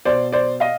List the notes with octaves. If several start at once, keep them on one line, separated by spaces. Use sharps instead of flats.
B2 C5 D5
C5 D5
D#5 F5